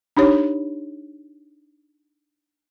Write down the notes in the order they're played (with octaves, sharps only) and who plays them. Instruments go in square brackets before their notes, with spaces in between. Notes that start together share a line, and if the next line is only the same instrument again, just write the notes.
[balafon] D4 D#4 G4 C#5